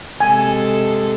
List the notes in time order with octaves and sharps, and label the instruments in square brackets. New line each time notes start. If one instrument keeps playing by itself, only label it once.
[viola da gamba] C3 G#3 A4 [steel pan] G#5